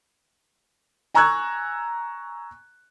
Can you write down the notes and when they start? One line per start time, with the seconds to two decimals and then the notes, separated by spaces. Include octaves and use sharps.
1.15 G#5 A#5 C#6 E6 F#6 G#6